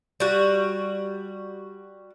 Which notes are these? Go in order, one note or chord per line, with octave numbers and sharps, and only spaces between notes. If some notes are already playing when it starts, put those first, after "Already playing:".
G3 F#4